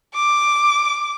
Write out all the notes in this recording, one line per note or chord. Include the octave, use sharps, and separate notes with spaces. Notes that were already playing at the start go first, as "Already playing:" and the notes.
D6